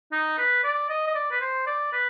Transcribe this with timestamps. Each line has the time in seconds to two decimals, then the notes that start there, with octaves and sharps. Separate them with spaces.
0.12 D#4
0.38 B4
0.64 D5
0.89 D#5
1.07 D#5
1.15 D5
1.31 B4
1.41 C5
1.67 D5
1.93 B4